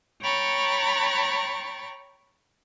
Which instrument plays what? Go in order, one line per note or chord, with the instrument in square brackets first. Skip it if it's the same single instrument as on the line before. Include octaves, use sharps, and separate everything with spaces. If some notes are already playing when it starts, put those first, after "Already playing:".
[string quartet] C#5 G5 A#5 B5 C#6 A6